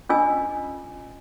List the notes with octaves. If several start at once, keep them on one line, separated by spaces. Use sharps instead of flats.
C#4 D4 F4 D#5 G#5 E6